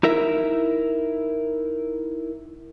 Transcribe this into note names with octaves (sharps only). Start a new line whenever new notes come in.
D#4 E4 A#4 E5